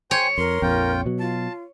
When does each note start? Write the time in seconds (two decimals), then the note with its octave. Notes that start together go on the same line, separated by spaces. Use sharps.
0.11 C5 C#5 G5 G#5
0.38 F2 A#4 C6
0.62 A#1 F2 F4 G5
1.06 B2 F#3
1.20 F4 A5